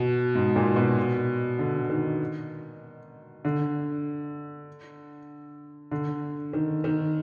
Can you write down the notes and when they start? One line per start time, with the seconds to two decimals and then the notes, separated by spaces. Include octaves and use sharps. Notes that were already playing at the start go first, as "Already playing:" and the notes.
Already playing: B2
0.35 G#2
0.56 A#2
0.76 B2
1.59 D3
1.90 D#3
3.45 D3
5.92 D3
6.53 D#3
6.84 D#3